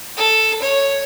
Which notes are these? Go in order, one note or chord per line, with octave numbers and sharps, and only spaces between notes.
A4
C#5